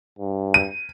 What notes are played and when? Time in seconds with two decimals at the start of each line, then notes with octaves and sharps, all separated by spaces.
0.19 G2
0.54 D#7